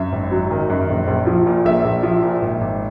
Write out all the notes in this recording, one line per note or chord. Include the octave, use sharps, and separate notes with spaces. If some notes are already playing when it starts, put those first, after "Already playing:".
Already playing: F#2 E5
G#1
F#3
D#3
F#2
A#1
A#1
F3
A#2
A#1 E5
A#1
F3
A#2
G#1
G#1